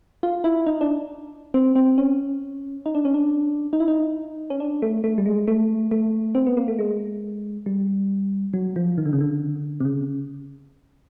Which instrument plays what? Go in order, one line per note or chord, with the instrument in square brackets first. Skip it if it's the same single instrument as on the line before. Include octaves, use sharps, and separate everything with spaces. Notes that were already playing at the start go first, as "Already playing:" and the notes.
[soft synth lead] F4
E4
D#4
D4
C4
C4
C#4
D#4
D4
C#4
D4
D#4
E4
D#4
C#4
D4
A3
A3
G3
G#3
A3
A3
C4
B3
A#3
A3
G#3
G3
F#3
F3
D#3
D3
C#3
D3
C3
C#3